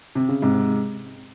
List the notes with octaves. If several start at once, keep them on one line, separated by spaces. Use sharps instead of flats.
C3
C#3
G#2 C3